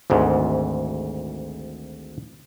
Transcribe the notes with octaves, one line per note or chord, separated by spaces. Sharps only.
G#1 D2 G#2